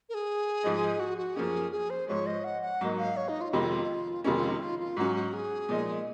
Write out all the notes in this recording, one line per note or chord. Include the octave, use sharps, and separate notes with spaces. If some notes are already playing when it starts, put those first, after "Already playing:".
A#4
G#4
G#2 F3 G#3 D#4
F#4
F#4
F#2 F3 A#3 C#4 G#4
G#4
C5
G#2 F3 G#3 C#5
D#5
F#5
F#5
G#2 F#3 A#3 D#4
F5
C#5
D#4
F4
F2 C3 D#3 G#3 D#4 F4
F2 C3 D#3 G#3 C#4 F4
F4
D#4
F4
F4
G#2 F#3 C#4 F#4
F#4
G#4
A#2 F3 G#3 D#4